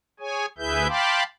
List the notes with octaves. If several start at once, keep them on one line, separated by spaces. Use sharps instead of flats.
G#4 C#5 G#5
D2 E4 G#4 B4 E5 G6
F5 G5 A5 B5 C6 D6